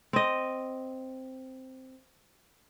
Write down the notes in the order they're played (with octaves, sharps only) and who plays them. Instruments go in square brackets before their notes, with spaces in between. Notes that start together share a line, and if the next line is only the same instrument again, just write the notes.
[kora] C4 D#5